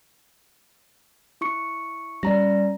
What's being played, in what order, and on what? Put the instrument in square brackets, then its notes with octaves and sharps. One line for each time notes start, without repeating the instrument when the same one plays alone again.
[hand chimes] E4 C#6 C#7
[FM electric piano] G3 C#4 [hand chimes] D5 A#5 A#6